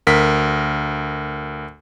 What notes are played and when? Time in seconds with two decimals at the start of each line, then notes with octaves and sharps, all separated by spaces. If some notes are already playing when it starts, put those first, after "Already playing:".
0.07 D2 A#4 B6